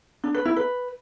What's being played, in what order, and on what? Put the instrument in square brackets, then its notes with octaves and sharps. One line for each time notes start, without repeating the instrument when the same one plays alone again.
[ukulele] D4
B4
E4
B4